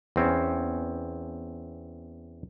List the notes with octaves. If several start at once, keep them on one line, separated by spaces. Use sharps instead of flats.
E2 C4 C#4